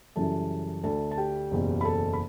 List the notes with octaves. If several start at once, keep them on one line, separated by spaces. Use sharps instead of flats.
F#2 C#3 E3 G3 A4 A5
D2 D3 A3 A4 A5
A5
G4 G5
F#1 E2 B2
B5
A4 A5
B5